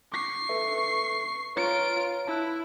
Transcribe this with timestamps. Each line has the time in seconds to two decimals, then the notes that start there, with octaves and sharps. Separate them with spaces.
0.12 C#6 D6 C7
0.49 A4 B4 E5
1.56 F4 B4 C#5 A#5 D7
2.27 E4 A5 F#6